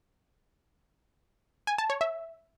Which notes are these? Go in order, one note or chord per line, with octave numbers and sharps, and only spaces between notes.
G#5
A5
C#5
E5